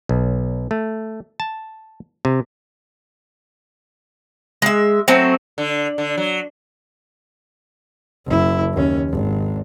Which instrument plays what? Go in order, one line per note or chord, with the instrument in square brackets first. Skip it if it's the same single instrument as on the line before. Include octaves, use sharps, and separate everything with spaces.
[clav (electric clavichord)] B1
A3
A5
C3
[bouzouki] G#3 E5
F#3 A3 C4
[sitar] D3
D3
F#3
[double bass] F#1 E4
D#2 C#4
G#1